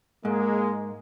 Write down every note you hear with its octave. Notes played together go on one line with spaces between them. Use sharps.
G#2 G#3 A#3